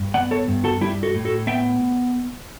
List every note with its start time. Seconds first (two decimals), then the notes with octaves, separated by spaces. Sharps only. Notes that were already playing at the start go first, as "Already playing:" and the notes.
Already playing: G2
0.14 B3 D5 F#5
0.31 A4 C#5
0.48 G2
0.64 F#4 A4
0.81 G3 E4 G4
1.03 F#4 A4
1.14 A2
1.25 F#4 A4
1.47 B3 E5 G5